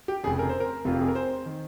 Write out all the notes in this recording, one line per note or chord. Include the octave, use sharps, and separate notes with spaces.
G4
F1 F2 C#3 G#4
A#4
C5
A#4
F1 F2 C3 F4
G4
G#4
A#4
C5
D#3